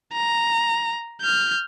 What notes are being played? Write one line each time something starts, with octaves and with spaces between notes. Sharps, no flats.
A#5
F6 G6